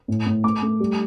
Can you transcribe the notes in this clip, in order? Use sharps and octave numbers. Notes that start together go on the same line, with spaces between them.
A2
A2
A3 D6
A3
G3